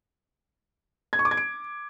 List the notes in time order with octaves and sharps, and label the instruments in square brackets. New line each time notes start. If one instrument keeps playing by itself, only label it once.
[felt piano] G#6
C#6
D6
G#6
D7